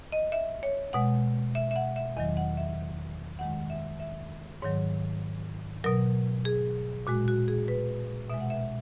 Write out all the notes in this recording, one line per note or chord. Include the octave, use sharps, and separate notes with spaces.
D#5
E5
C#5
B2 G#3 F#5
E5
E5
F#5
E5
E2 D#3 F#3 D#5
F#5
E5
F#2 D#3 G#3 F#5
E5
E5
G#2 D#3 F#3 C#5
B2 F#3 A#4
G#4
A#2 G#3 F#4
F#4
G#4
B4
B2 G#3 E5
F#5
E5
E5